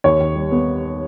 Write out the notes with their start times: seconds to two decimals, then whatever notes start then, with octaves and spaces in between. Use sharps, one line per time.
0.04 D#2 C#5
0.20 D#2
0.35 G3
0.51 B3